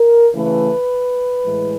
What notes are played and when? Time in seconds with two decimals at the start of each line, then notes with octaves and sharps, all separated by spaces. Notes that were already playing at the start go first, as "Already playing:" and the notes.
Already playing: A#4
0.33 C#3 E3 A3 B4
1.44 A2 E3 G#3